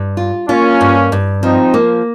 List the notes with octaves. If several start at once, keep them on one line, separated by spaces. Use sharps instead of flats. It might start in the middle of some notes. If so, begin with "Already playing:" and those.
Already playing: G2
F4
A#3 C#4 F4
G2
G2
F3 C4 D#4
A#3